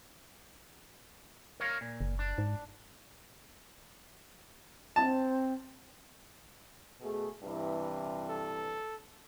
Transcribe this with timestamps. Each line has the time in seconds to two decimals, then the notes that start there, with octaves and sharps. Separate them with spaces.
1.60 A#4 C#5 F5
1.81 A#2
2.01 F#1
2.19 D4
2.38 G#2
4.96 C4 A5
7.01 B2 A3 G#4
7.42 G2 C3 E3
8.29 A4